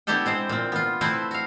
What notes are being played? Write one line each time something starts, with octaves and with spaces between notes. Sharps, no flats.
B3 D4 E4 G4 A4 G5
G#3 C4 C5
A#2 C4
B3 F4
A3 C4 E4 B4 C5
F#4 F5